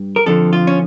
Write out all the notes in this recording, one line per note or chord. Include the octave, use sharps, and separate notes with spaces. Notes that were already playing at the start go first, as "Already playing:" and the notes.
Already playing: G2
A#4
F2 D3 F3 A4
F4
C#4